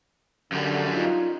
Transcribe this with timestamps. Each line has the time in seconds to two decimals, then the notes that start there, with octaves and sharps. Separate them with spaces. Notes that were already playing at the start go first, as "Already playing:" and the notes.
0.52 F#2 D3 G3
0.93 D#4 F4